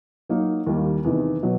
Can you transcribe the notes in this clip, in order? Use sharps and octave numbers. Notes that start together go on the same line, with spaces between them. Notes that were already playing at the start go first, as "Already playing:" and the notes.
F#3 A#3 D#4
D#2 D#3 G3 A#3
E2 C3 D#3
B2 F#3